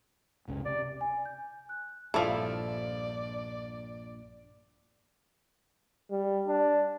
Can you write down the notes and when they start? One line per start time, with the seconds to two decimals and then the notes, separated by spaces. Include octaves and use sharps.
0.48 F#1 C#2 C#3
0.65 C3 D5
1.01 G#5
1.25 G6
1.69 F#6
2.14 A#1 G2 F3 E4 F4 A4 D5
6.11 G3
6.47 D4